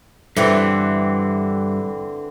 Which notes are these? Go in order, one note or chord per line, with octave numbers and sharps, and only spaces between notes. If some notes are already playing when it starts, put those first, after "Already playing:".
G2 D3 E3 C4